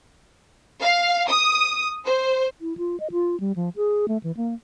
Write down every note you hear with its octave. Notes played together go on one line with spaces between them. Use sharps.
F5
D#6
C5
E4
F4
D#5
F4
G3
F3
G#4
A3
E3
A#3